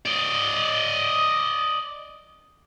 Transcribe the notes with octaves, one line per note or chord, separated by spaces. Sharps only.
D5 D#5